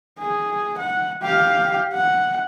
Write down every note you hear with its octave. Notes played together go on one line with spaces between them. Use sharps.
G#4
F#5
G4 F5
F#5